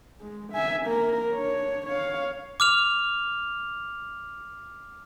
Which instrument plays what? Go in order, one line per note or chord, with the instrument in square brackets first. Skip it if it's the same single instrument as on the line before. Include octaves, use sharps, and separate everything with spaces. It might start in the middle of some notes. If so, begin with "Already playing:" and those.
[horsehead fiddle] G#3
E5 G#5
A#3 A#4
D4 C#5
C#5 F5
[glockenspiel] D6 F6 F7